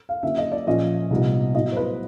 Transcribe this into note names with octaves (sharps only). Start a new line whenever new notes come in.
F5
D3 F#3 A#3 C#4 E4 E5
D#5
D5
A#2 F3 A#3 C#4 D#5
C2 A#2 G3 B3 D#4
A2 F#3 B3 E4 D#5
C5
B4